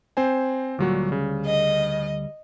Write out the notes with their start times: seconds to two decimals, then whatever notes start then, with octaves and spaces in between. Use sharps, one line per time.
0.17 C4 C5 G#5
0.79 D2 A#2 F#3 G3 F#4
1.12 C#3
1.45 D#5